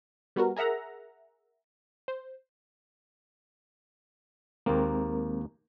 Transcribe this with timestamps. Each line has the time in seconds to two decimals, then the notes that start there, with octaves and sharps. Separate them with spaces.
0.36 G3 B3 F#4 A#4
0.56 G#4 A#4 E5 F#5 A#5
2.08 C5
4.66 D#2 G#3 A#3 C4 A#4